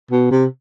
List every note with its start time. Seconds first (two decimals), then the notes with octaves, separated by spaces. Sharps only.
0.11 B2
0.31 C3